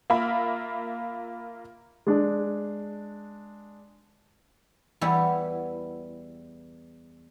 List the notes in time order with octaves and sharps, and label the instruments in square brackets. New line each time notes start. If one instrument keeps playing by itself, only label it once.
[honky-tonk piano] A#3 F4 E5 B5
[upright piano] G#3 D4
[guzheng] E2 G3 B3 E4